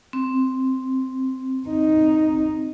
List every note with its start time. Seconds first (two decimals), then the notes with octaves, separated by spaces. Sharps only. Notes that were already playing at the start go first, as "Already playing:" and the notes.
0.13 C4
1.68 D#4